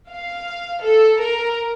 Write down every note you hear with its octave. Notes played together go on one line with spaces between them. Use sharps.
F5
A4
A#4